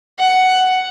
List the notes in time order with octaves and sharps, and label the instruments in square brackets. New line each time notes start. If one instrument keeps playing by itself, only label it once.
[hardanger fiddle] F#5